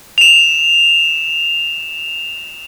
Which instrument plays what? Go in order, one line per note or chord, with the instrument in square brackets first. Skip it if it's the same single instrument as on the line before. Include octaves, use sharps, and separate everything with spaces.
[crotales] E7 F7